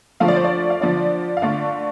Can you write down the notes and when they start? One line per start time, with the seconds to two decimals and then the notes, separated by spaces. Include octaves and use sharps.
0.20 D3 F3 A3 F4 F5
0.28 D5
0.36 C5
0.44 D5
0.70 F5
0.81 D3 F3 D4 D5
1.37 F5
1.42 D3 A3 D4 F4 D5